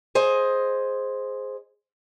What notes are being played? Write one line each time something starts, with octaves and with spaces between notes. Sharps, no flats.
G#4 C5 D#5